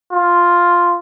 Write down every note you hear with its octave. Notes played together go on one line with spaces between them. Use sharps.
F4